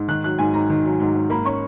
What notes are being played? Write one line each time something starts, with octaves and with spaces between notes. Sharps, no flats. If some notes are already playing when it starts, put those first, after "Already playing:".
Already playing: G#2
D#3 F#6
F#3 F#6
G#2 G#5
G#2 A#5
D#3
F#3
G#2
G#2
A#3 B5
C#4 C#6